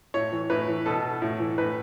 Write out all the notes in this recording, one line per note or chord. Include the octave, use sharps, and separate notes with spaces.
A2 C#5
E3
A2 B4
E3
B2 A4
A2
E3
A2 B4